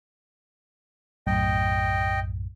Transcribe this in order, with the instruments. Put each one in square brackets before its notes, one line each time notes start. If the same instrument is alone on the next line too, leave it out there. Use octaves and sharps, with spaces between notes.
[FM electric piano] B1 F#2 A2 [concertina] D#5 G5